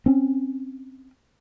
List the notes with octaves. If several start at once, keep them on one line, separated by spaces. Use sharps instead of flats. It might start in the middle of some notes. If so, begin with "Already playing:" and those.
C4 C#4